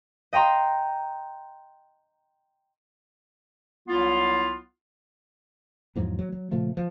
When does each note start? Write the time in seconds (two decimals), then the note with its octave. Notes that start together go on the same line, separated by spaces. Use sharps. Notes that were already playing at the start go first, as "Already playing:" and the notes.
0.33 D#5 G5 A#5 C6
3.88 C2 F#3 B3 E4 F4
5.95 E2 G#2 F3 F#3
6.19 F#3
6.32 F#3
6.51 A#2 C#3 F3 A3
6.77 F3